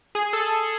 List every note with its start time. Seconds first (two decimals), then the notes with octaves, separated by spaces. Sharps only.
0.15 G#4
0.33 A4